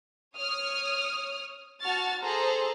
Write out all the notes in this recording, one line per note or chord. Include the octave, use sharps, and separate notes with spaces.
C#5 D#6 F6
F#4 A5 C#6 F6 A6
G#4 A4 C5 A#5